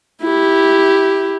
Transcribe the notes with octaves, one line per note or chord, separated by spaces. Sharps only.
E4 G4